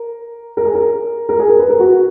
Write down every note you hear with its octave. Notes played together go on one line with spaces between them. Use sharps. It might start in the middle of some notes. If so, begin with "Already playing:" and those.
Already playing: A#4
A#4
G#4
A#4
A#4
G#4
A#4
B4
A#4
F#4